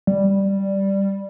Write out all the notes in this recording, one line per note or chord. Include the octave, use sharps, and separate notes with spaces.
G3